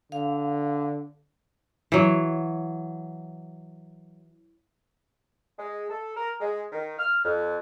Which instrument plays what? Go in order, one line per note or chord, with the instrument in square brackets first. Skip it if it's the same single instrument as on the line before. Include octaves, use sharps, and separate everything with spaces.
[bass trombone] D3 [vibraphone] F5
[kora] E3 F#3
[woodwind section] G#3
A4
A#4
G#3
D#3
F6
F2